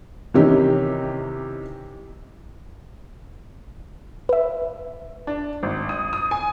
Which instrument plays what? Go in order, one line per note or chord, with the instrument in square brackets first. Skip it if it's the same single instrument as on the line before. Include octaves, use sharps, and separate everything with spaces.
[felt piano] C3 D#3 E3 C#4 D#4 G4
[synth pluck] B4 E5
[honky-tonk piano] D4
G#1
D#6
D#6
G#5